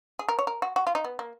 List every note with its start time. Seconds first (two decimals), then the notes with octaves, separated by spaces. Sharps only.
0.19 G#4
0.28 A#4
0.39 C#5
0.47 A#4
0.62 F#4
0.76 F#4
0.87 F4
0.95 D#4
1.04 B3
1.19 A#3